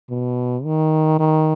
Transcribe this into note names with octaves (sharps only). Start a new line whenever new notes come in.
B2
D#3
D#3